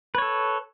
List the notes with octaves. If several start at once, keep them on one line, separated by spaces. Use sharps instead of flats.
A4 B4 C#5